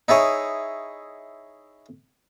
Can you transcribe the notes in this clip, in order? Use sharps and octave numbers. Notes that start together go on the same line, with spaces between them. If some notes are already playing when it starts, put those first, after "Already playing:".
D#4 E4 G#4 C#5